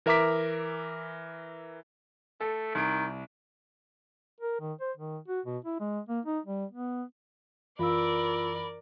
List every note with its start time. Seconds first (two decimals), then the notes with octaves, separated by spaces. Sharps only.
0.06 E3 A#4 E5 A#5 D6 B6
2.41 A3 A4
2.75 C2 D#3 D7
4.41 A#4
4.61 D#3
4.81 C5
4.97 D#3
5.28 F#4
5.45 B2
5.65 E4
5.80 G#3
6.09 A#3
6.26 D#4
6.46 G3
6.72 B3
7.79 F#2 E3 F4 A#4 D5 F5 B5 E6